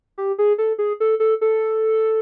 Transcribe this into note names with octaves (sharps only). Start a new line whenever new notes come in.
G4
G#4
A4
G#4
A4
A4
A4